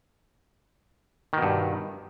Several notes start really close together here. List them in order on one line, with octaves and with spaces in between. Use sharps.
D#3 B2 G2